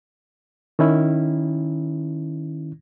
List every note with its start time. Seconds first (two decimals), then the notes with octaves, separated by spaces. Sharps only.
0.79 D#3 C#4 E4